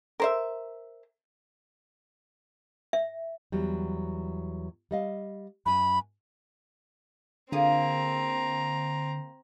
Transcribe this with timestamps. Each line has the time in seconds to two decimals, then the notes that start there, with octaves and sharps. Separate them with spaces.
0.20 A#4 C5 E5
2.93 E5
3.52 E2 F#3 G3
4.91 G3 D#5 F5
5.66 F#2 G#5 B5
7.52 D3 A#3 C4 F4 G#4 A#5